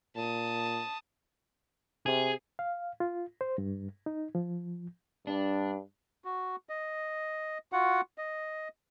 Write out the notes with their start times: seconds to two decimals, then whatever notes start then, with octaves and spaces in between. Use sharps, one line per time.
0.16 A#2 A5 D#6
2.06 C3 G#4
2.59 F5
3.00 F4
3.41 C5
3.58 G2
4.06 D#4
4.35 F3
5.27 G2 D4
6.25 F#4
6.69 D#5
7.72 F4 F#4 F#5
8.18 D#5